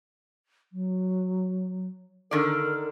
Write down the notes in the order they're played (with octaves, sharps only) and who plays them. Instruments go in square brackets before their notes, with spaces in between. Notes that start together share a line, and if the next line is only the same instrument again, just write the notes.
[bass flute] F#3
[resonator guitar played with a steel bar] D3 D#3 D5 [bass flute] A#4